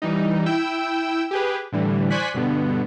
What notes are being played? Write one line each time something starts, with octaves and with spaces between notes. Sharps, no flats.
E3 G3 D#4
E4 G5 E6
G4 G#4 B4
A2 D3 E3 G3
C5 D5 G#5 C#6 F#6 B6
G2 B2 D3 B3